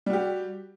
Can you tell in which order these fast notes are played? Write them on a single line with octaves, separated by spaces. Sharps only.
G3 F#4 G4